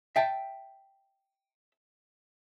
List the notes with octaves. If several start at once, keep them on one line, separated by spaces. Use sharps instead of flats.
E5 G5 A5